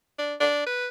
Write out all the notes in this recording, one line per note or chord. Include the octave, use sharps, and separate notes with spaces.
D4
D4
B4